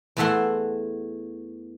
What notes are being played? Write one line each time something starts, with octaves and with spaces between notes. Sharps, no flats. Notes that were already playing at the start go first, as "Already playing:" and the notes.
E2 E3 A3 E5 F#5 C6